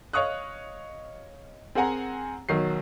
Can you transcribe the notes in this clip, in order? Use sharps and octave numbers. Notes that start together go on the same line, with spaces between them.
C#5 D#5 F5 C#6 D#6 F#6
C4 G#4 A#4 F#5 G#5 A#5
B1 D#3 F#3 C7